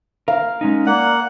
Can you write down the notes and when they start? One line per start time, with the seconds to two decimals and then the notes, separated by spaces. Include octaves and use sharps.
0.28 A#4 F5
0.61 G#3 C#4 D#4
0.86 A#3 D5 F#5